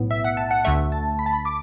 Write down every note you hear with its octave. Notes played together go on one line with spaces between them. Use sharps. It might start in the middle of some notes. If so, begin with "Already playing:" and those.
Already playing: B1 A2 B3
E5
F#5
A5
F#5
D2 D3 A3 E5
A5
B5
A5
B5
D6